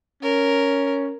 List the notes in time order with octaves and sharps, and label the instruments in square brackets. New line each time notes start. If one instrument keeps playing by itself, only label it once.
[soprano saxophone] C#4 [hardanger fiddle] A#4